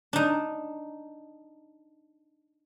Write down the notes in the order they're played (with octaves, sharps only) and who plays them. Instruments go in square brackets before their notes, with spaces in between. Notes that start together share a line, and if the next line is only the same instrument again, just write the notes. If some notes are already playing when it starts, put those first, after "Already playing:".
[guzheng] D4 D#4